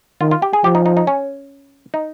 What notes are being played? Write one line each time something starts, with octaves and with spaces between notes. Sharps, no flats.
D#3 F4
F4
G4
G#4
F3 G4
D#4
D#4
D#4
C#4
D#4